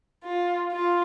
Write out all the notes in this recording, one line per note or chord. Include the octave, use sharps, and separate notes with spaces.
F4
F4